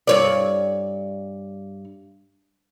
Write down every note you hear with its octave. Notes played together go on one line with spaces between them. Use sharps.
G2 C#5 D5